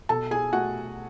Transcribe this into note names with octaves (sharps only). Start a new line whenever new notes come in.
B2 A4 A5
G#4 G#5
A3 F#4 F#5